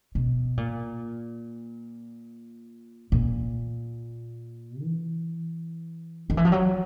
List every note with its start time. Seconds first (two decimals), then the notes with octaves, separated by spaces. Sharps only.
0.15 B2
0.57 A#2
3.12 A#2
4.82 E3
6.30 D#3
6.37 E3
6.45 F3
6.52 F#3